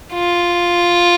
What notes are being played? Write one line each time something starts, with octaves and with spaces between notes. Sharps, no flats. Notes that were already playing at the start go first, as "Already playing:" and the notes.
F4